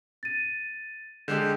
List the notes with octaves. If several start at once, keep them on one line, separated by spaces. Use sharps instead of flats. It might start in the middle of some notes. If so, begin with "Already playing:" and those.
A6 D#7
D3 G#3 G4 G#4 G6 E7